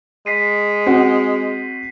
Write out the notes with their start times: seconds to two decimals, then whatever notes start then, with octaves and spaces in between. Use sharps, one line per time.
0.26 G#3 B6 C7 D#7
0.86 C4 F#4